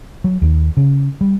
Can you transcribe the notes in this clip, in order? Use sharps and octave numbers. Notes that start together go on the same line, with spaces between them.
F#3
D#2
C#3
G3